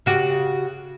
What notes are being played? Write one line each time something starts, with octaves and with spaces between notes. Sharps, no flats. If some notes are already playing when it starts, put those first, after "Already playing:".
C#3 F#4 G4